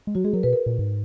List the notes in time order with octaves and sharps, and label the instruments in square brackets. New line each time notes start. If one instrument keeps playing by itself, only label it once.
[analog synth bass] G#3
[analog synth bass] F#3 [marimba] F#4
[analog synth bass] G#3 [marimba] G#4
[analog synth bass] F#3 [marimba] A#4
[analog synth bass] B2 [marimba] B4
[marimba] A#4
[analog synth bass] A#2
G#2